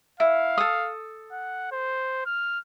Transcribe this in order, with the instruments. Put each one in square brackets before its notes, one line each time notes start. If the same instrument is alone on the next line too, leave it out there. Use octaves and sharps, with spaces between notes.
[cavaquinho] E4 [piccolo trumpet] F5
[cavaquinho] A4 D#6
[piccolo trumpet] F#5
C5
F6